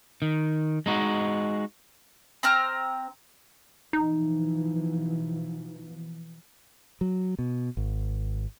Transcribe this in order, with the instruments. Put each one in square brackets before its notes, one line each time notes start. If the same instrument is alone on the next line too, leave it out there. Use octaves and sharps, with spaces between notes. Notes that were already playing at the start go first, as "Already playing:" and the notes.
[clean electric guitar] D#3
G#3 D#4 F#4
[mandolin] C4 A#5 F6
[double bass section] B2 E3 F3 [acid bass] D#4
[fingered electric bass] F#3
B2
G#1